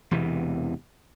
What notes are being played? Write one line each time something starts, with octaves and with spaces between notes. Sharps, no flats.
E1 E2 C3 E3